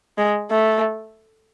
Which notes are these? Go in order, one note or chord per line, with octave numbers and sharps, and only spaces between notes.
G#3
A3